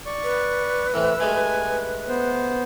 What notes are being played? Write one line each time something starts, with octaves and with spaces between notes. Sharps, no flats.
D5 C#6
B4
A2 E3 C4 E6
G2 G#3 A3 G#5
B3 C5